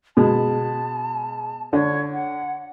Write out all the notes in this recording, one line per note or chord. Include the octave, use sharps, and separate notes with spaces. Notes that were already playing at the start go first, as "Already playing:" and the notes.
B2 G#3 A5
D3 C#5
F#5